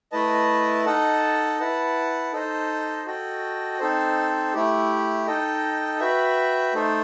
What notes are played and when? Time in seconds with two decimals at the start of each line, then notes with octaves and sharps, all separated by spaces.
0.12 A3 E4 B4 D#5 A5
0.86 D#4 A4 D#5 F#5 A5
1.59 E4 B4 F#5 A5
2.33 D#4 A4 C5 D#5
3.06 F#4 A4 D#5 G5
3.79 C4 D#4 A4 C5
4.53 A3 E4 G4
5.27 D#4 A4 D#5 G5
6.00 F#4 B4 E5 G5
6.74 A3 D#4 A4 C5